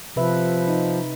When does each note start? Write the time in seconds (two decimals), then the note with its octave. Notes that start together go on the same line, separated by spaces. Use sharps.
0.16 C3 F3 B4 E5
0.68 D#4